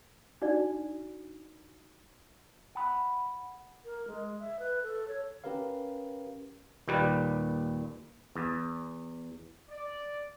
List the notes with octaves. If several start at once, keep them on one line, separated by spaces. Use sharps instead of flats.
D4 D#4 F#4 D5
F#5 B5
A#4
G#3
E5
B4
A4
C#5
C#4 G4 A#4 B4 F5
D#2 A#2 G3 B4
E2
D5